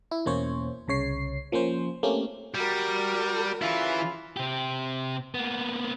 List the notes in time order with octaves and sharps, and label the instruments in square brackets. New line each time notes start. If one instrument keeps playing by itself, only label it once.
[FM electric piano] E4
E2 B2 A#3 C#4 C5 C#5
C2 C#3 C#5 C7
F3 A#3 C#4 C5
A3 A#3 C4 C#4 G4
[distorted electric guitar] G3 [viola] F#4 A#4
[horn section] C#3 F4 B5 [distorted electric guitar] E3 E4
[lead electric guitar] C3 G4
A#3 B3